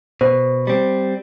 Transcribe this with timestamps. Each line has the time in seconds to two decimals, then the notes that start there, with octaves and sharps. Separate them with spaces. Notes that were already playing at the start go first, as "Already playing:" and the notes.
0.21 B2 C5
0.67 G3 C4